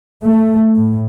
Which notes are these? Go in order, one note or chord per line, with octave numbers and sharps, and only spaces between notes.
A3
A2